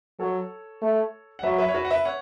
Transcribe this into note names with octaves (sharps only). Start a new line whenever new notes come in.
F#3 A4 C#5
A3
F#5
F#3 B4 E5
B4 E5
C#5
F#4 B4
F#5
B4 E5
C#5 F#5